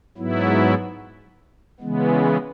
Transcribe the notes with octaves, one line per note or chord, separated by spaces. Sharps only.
G#2 F#3 B3 E4
C#3 E3 G#3 B3